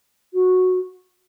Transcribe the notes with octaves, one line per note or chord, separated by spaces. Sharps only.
F#4